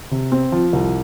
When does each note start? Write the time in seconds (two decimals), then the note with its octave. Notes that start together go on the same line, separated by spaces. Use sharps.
0.11 C3
0.32 C4
0.52 F3
0.73 C2